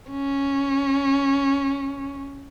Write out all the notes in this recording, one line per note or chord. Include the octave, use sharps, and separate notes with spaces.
C#4